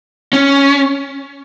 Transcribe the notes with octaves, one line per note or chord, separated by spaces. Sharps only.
C#4